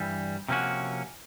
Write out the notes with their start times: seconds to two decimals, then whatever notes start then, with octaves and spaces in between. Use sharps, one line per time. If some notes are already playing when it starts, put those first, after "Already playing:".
Already playing: G2 E3 G3
0.48 C3 F3 A#3 C#4 F#4